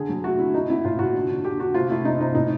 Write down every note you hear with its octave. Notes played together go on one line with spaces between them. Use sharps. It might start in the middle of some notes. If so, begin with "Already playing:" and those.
Already playing: D3 G#4
F#3
A3 F#4
D3 E4
E3 D#4
E3 E4
A2 F4
A2 F#4
D3
D3
D3 G4
D3 F#4
C3 F4
A3 E4
C3 D#4
C3 D#4
A2 D#4